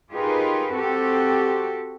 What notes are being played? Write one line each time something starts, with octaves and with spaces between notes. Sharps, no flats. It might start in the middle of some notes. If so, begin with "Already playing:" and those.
D#4 F4 G4 G#4 A#4 B4
C4 F#4 G4 A4